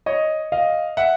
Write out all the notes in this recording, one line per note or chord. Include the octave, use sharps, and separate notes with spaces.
C#5 D#5
D#5 F5
E5 F#5